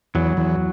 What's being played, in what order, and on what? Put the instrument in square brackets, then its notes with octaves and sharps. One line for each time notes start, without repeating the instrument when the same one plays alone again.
[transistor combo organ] E2 [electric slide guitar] F#3
[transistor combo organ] E2